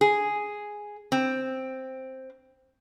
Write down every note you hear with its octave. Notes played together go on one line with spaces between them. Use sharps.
G#4
C4